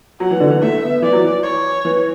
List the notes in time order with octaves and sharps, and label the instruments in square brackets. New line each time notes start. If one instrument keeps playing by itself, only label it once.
[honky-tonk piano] F#3 [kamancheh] F#5
[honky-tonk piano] E3
D3
E3
[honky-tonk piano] A3 [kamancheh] E5
[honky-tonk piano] B3
[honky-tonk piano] E3 [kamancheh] D5
[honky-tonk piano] F#3
E3
[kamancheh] C#5
[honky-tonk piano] E3